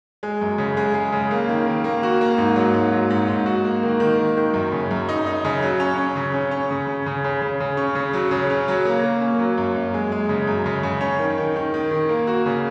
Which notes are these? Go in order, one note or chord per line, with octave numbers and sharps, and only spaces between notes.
G#3
F#2
C#3
G#3
G#3
C#3
A#3
D#3
D#3
A#3
F#4
A#3
G#2
F#3
G#2
F#3
G#2
G#2
F#4
A#3
D#3
D#3
D#3
D#3
F#2
C#3
F#2
D#4
D#4
C#3
F#3
C#4
C#4
C#3
C#4
C#4
C#3
C#3
C#3
C#3
C#3
C#3
C#4
C#3
F#3
C#3
C#4
F#3
A#3
A#3
C#4
F#3
F#2
F#2
G#3
G#3
C#3
F#2
C#3
C#3
C#4
D#3
D#3
D#3
D#3
D#3
A#3
F#4
C#3